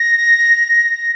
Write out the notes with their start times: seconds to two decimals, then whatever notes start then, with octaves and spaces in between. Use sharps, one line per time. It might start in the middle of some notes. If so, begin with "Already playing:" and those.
Already playing: A#6